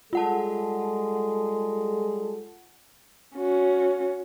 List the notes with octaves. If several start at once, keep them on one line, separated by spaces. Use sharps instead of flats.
G3 G#3 F4 G#4 A4 F#5 A5
C#4 F#4